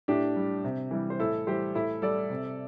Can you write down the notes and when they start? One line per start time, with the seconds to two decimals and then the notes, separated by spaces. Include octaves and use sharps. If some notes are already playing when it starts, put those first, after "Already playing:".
0.08 A2 D4 G4
0.36 G3
0.64 C3
0.91 E3 G3
1.10 C5
1.19 A2 E4 A4
1.47 E3 G3 G4 C5
1.75 A2 E4 A4
2.02 G3 A4 D5
2.30 C3